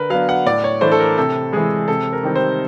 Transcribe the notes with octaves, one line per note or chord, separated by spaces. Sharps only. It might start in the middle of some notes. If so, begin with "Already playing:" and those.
Already playing: D3 A#4 B4
F#3 B3 D4 F5
F#5
A2 D5
C#5
E3 A3 D4 C5
A4
A#4
C3 A4
E3 G#3 G#4
C3 A4
A#4
D#3 G3 C4 D#4
C5